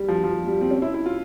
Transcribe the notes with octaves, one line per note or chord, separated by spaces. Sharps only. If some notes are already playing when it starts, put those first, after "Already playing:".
Already playing: G3
F3
F3
G3
C4
C#4
E4
E4
F4